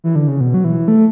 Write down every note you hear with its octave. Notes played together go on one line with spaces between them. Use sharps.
E3
D3
C#3
B2
F#3
E3
A3